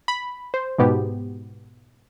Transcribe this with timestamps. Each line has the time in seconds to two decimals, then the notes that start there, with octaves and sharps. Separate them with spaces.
0.08 B5
0.54 C5
0.78 G#2 B2 B3 G4